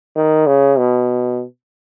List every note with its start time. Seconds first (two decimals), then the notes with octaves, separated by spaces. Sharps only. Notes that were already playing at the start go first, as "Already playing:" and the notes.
0.16 D#3
0.47 C#3
0.78 B2